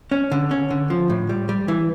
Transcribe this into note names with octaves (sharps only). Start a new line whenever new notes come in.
C#4
D3
C#4
D3
F3
A2
G3
G3
E3